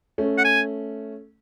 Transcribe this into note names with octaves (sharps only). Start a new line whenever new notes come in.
A3 C#4
F#5
G#5